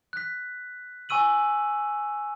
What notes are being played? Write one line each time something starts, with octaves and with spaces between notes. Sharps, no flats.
F#6 B6
G#5 C#6 E6 D#7 F#7